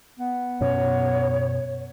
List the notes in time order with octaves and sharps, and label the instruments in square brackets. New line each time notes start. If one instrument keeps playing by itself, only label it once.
[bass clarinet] B3
[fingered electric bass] F#2 B2 C#4 [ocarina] C#5